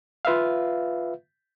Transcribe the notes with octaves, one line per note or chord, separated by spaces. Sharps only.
F4 B4 E5 F5